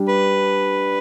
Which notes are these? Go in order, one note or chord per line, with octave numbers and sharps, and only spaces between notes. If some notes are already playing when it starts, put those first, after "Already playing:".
Already playing: G3 D4
B4